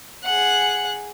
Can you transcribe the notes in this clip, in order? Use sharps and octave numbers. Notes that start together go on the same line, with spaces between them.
G#4 F#5